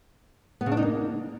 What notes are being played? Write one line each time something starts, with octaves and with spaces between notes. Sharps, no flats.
B3
C#3
D4
D#4
A#3